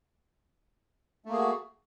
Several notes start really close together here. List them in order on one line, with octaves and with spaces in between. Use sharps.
A3 A#3 G#4 F#4